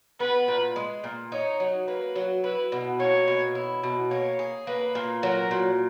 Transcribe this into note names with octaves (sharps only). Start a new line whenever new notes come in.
B3 B4
A#2
G#3
A#2
D#4 C#5
F#3
A#3 B4
F#3
E4 B4
B2
A#3 C#5
B2
E4
B2
A#3 C#5
G#4
A#3 B4
A#2
F#3 A#4
A#2